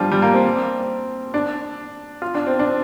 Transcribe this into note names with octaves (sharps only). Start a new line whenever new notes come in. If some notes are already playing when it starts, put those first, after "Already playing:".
Already playing: F3 G3 D4 F4
G3
A#3
C4
D4
F4
D4
C4
D4